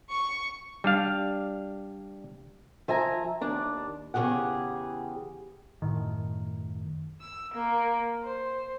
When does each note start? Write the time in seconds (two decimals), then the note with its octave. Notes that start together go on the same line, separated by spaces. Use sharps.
0.11 C#6
0.84 G3 D4 F5
2.88 F3 E5 G#5 A#5
3.41 D#2 D4 D5
4.14 E2 C#3 F3 G4 G#4 F#5
5.82 F#2 A2 D#3
7.20 E6
7.54 A#3
8.24 C5